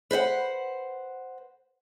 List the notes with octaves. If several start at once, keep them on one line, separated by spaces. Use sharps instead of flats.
B4 C5 D#5 F#5